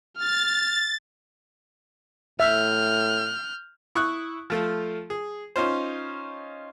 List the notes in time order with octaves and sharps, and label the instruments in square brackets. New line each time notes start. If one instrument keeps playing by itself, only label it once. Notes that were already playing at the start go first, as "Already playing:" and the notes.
[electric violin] F6 [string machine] A6
[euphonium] A2 [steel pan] E5 [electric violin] F6 G6
[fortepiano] E4 C#6 D#6 F#6
F3 A3 F4
G#4
C#4 D#4 F4 C5